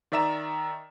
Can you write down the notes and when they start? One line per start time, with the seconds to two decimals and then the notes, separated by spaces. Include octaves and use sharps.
0.12 D#3 D5 E5 A#5 E7